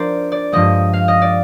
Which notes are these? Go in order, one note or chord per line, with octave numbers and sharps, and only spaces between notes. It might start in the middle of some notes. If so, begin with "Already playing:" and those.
Already playing: F3 D4 A#4 C5 D5
D5
G2 F3 G#3 D#5
F5
D#5
D5